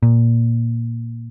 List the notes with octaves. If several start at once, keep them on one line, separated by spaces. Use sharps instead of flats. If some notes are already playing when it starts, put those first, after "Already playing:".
A#2